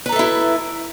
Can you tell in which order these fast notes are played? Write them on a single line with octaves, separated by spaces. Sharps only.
B4 A#5 A4 E5 E4